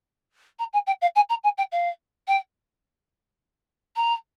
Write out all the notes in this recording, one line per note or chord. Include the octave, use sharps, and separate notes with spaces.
A#5
G#5
G5
F5
G#5
A#5
G#5
G5
F5
G5
A#5